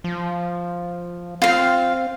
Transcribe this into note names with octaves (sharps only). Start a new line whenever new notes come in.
F3
C4 F4 F5